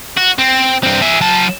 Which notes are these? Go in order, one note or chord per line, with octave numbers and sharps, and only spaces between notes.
F#4
C4
G2 C4
G#4 E5
F#3 A5